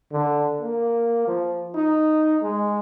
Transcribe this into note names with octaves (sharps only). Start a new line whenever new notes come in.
D3
A#3
F3
D#4
G#3